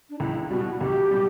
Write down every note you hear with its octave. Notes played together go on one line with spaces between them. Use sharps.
D4
C#2 E4
B2 G3 F#4
C#2 G4
B2 G3